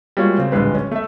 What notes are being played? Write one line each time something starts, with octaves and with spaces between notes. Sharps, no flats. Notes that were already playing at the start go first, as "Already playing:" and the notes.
G3 G#3 A#3 F4 F#4 C#5
C#3 C4
D1 A#1 G3 G#3 B4
C#4
A3 E5